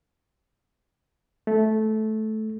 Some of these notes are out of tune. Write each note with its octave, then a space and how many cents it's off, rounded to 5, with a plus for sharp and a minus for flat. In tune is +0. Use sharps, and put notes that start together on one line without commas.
A3 -15